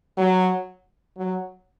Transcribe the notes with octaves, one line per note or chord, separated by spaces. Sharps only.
F#3
F#3